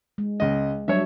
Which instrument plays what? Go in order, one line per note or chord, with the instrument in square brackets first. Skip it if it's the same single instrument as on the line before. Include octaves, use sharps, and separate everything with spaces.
[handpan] G#3
[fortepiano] C#2 D#5
[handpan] F#3 G3 D4 [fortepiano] C#5 E5